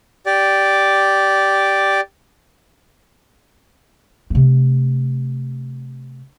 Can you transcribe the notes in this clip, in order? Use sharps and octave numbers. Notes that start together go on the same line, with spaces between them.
G4 D5
C3 A3